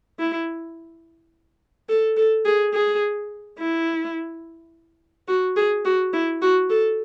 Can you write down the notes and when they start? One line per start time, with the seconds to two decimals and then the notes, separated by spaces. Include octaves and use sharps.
0.19 E4
1.89 A4
2.17 A4
2.45 G#4
2.73 G#4
3.58 E4
5.28 F#4
5.56 G#4
5.85 F#4
6.13 E4
6.41 F#4
6.70 A4